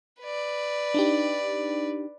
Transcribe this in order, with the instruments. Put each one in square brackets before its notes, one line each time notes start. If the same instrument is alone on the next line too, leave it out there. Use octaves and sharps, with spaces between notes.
[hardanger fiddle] B4 D5
[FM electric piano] D4 D#4 G4